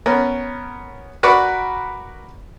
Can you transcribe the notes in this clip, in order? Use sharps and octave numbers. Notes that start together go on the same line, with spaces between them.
B3 C#4 A#4
F#4 A#4 B4 D5 A#5 C#6